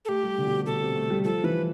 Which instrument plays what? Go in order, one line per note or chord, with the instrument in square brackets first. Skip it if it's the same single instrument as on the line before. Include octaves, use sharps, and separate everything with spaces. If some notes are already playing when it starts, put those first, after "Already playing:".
[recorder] A4
[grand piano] A3 [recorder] G4
[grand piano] G3
D3
B2
C3
[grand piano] B2 [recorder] A4
[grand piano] C3
A3
G3
[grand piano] F3 [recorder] A4
[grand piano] E3 [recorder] B4